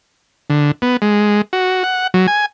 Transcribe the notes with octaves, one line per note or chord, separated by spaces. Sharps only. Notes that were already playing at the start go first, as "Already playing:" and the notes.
D3
B3
G#3
F#4
F#5
F#3
G#5